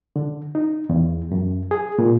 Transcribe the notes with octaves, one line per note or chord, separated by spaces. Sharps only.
D3
D#4
E2
F#2
G#4
A#2